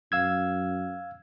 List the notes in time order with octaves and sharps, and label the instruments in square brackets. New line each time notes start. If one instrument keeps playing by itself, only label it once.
[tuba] F#2 [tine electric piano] F5 E6 G#6